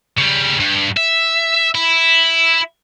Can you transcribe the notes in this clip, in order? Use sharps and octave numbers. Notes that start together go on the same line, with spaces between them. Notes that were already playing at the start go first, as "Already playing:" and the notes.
C#3 G3
G2
E5
E4